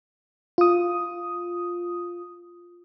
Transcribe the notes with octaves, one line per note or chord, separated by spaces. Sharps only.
F4 D#6